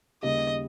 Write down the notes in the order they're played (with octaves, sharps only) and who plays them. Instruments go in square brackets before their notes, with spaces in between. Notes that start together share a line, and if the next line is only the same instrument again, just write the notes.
[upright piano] D#2 C#3 G3 [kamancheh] D#5